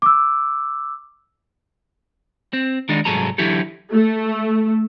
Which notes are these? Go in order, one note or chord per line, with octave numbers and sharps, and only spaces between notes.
D6 E6
C4
D#3 G#3 D4 D#4
C2 G#2 F#3 G#4 A4 A#5
D3 E3 F#3 E4 G4 A4
A3